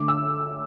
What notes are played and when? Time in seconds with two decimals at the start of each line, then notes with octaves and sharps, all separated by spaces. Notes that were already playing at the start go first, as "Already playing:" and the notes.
Already playing: D3 A3 D6
0.08 E6